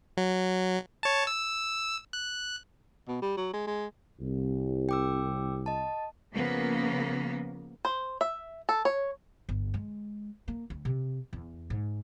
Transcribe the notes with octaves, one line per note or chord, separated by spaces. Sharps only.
F#3
C#5 A5
E6
F#6
B2
G3
F#3
G#3
G#3
C2
G5 D6 E6
D#5 A5
C#3 F3 A#3 B3
C5
E5
A4
C#5
G1
G#3
A#3
D2
C3
E2
G#2